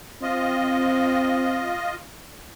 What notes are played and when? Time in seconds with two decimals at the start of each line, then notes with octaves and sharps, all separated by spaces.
0.22 C4 F4 D#5